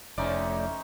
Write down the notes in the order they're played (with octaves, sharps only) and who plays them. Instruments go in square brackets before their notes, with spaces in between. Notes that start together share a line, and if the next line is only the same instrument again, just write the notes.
[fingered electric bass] F1 [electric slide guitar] A3 D5 [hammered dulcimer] C#4 D#4 C5 [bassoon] E4